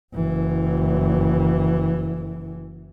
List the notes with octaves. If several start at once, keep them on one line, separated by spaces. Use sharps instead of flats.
F#1 E3